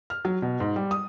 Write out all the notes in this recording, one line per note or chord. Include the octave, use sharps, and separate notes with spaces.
F6
F#3
B2
G#2
G3
D#6